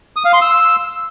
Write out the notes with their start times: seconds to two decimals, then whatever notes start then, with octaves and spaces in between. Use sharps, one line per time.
0.16 D#6
0.25 F5
0.33 C6
0.42 E6